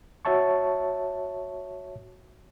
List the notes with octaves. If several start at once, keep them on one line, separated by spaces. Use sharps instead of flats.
F#4 C#5 E5 A5 C#6